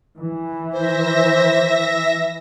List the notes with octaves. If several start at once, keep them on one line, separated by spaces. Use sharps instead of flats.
E3
C5 E5 A#6